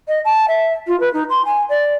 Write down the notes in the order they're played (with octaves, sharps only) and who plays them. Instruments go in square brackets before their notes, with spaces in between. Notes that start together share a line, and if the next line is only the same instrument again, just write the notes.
[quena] D#5
A5
E5
F4
B4
D#4
C6
G#5
D5